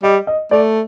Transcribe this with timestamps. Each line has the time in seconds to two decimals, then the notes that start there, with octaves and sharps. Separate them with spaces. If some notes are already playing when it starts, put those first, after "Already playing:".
0.03 G3 D#5
0.27 D#5
0.51 A3 D5